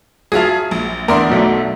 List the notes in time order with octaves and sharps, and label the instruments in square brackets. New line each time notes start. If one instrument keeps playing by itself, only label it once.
[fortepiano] F#3 E5 A5 [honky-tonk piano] F4 G#4
[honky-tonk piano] A#1
[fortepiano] E2 D4 E5 [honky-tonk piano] A#4 D5 C6
[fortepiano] B1 F#3 A3